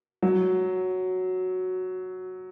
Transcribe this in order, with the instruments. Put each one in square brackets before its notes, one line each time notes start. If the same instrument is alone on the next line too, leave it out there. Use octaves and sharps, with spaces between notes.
[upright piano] F#3